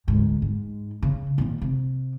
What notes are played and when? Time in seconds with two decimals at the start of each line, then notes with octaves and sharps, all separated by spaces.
0.08 D2 G#2
0.42 G#2
1.02 C#3
1.38 A#2 D#3
1.62 C3